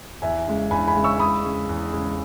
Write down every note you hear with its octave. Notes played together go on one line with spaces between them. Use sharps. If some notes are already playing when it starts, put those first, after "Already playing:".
E2 E5 G#5
C#3 G#3
E2 G#5 B5
G#5 B5
C#3 G#3
C#6 E6
E2 B5 D#6
C#3 G#3
E2
C#3 G#3